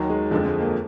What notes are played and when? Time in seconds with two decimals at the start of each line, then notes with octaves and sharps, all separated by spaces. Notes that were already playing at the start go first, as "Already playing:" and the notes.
Already playing: D#2 D#3 F#3
0.10 G#3
0.31 F2 D3 F3 G#3
0.45 G#3
0.61 A#3